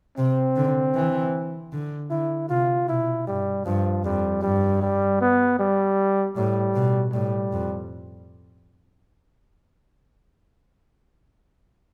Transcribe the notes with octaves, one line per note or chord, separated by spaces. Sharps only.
C3 C4
D3
E3
D3
D3 E4
C3 F4
B2 E4
G2 G3
G2 F3
F2 G3
G2 G3
G3
B3
G3
A2 G3
B2
A2 G3
F2